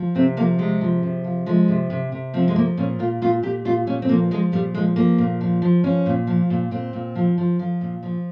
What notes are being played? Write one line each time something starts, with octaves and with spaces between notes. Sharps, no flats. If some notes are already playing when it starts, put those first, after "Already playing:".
Already playing: F3
C3 C4
F3 A#3
C3 G#3
F3
C3
F3
F3 G#3
C3
C3
C3
F3 C4
G#3
F3 A#3
A#2 C#4
A#2 F4
A#2 F4
A#2 G4
A#2 F4
A#2 C#4
C4
F3 A#3
F3 G#3
A#2 G3
F3 G#3
F3 A#3
A#2
F3
F3
F3 C#4
A#2
F3
A#2
A#2 C4
A#2
F3
F3
F3
A#2
F3